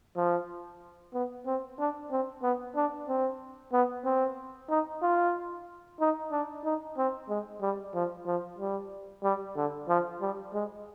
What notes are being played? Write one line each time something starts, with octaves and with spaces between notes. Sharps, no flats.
F3
B3
C4
D4
C4
B3
D4
C4
B3
C4
D#4
F4
D#4
D4
D#4
C4
G#3
G3
F3
F3
G3
G3
D3
F3
G3
G#3